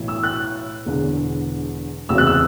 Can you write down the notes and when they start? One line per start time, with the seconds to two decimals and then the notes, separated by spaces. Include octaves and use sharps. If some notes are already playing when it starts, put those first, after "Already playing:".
Already playing: B1 A2 E3
0.08 E6
0.24 F#6
0.85 E1 E2 D3
2.09 F#1 E2 C3 F#3 E6
2.18 F#6
2.27 E6